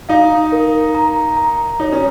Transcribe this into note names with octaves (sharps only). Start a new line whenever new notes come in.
D#4 F5
A#4
A#5
A#5
D#4 C#5
C#4